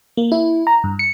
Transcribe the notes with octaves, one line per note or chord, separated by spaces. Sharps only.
A#3
E4
A#5
G2
C#7